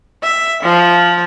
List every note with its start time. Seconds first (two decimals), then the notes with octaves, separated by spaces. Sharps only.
0.23 E5
0.64 F3